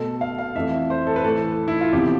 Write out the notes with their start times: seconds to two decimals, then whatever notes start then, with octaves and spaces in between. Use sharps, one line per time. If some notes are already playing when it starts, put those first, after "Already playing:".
Already playing: B2 A3 A4
0.21 F5
0.38 F5
0.55 F2 E3 A3 E5
0.90 C5
1.07 A4
1.16 B4
1.24 A2 E3 A3 A4
1.68 E4
1.81 F4
1.93 E2 C3 F3 G4